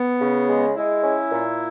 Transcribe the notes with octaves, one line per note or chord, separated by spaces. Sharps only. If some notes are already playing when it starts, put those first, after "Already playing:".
Already playing: B3
C#3
G#3
G#3 E4
C#4
A#2